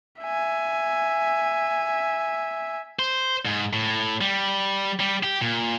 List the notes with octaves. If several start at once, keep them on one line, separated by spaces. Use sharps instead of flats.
E5 G#5
C5
G#2
A2
G3
G3
G4
A#2